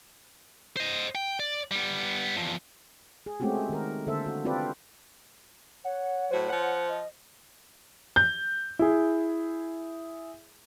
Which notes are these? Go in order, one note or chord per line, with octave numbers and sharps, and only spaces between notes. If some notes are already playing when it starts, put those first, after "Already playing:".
C5 D#5
G5
D5
G3 B3
E2 F3
G#4
G#3 A3 C4 C#4 F#4 G4
D#3 A#4
D3 A#3 A4 C5 E5
F#4
C4 F4 G4 A4 B4 D5
C#5 F#5
A2 F#3 F#4 C5
F3 F#5
D#5
G6
E4 G#4